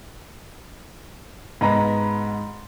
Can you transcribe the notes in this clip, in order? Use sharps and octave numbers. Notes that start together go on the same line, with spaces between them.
G#2 B3 D#5 A#5 B5